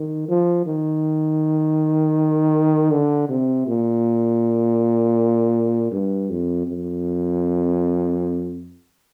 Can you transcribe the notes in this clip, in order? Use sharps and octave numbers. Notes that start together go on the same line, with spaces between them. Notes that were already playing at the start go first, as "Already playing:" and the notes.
Already playing: D#3
F3
D#3
D3
C3
A#2
G2
F2
F2